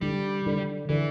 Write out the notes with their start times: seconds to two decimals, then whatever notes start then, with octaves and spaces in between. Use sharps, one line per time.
0.01 D3 G3
0.46 D3
0.89 D3 E3